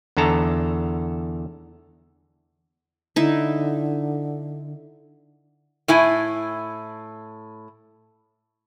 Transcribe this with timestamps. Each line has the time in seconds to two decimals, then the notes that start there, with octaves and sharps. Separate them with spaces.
0.17 E2 D3 A4 A5 A#5
3.16 D3 D#4 E4
5.88 A2 E4 G#5